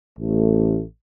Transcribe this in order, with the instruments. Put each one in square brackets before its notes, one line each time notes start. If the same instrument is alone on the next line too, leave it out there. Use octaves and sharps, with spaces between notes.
[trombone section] A1 A3